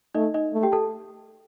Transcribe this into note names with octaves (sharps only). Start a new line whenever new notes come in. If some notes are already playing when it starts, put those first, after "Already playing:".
A3 D#4 D#5
D#4 D#5
A3
G4 G5
A4 A5